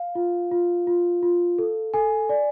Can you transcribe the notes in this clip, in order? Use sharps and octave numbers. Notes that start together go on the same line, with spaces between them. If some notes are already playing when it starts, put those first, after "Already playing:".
Already playing: F5
F4
F4
F4
F4
A4
A4 G#5
D5